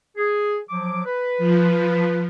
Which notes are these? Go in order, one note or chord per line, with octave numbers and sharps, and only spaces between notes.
G#4
F3 F#3 D6
B4
F3